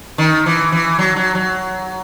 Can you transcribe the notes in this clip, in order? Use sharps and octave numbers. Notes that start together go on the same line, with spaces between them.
D#3
E3
E3
F#3
F#3
F#3